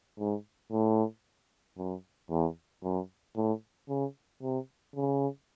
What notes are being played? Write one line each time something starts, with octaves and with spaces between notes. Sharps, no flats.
G#2
A2
F#2
E2
F#2
A2
C#3
C3
C#3